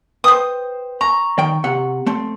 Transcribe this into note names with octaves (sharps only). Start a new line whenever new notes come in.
B4 C5 G5 D#6
A#5 C#6
D#3 G5
C3 F#5
A3 C4